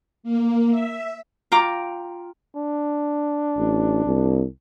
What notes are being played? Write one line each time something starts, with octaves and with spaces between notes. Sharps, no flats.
A#3
E5
F4 G5 A#5 D6
D4
A1
C2